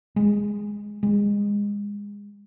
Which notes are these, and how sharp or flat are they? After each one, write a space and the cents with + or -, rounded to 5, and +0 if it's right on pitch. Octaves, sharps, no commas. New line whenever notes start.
G#3 -10
G#3 -25